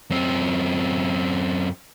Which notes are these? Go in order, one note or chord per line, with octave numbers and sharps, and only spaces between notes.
F#2 C4